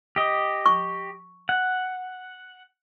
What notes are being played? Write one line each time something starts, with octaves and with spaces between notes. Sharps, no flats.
G4 D#5
C#6
F#5